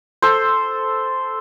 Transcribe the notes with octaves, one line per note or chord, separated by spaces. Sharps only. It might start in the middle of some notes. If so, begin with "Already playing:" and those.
A4 C5